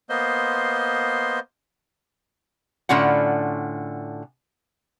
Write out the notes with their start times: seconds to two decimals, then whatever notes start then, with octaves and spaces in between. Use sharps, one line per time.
0.10 A#3 B3 C5 D#5 C6
2.89 A2 D3 C#4 F4 F#5